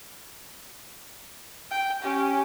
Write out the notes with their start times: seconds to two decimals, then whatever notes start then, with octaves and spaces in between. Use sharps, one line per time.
1.71 G5
2.02 C#4 G4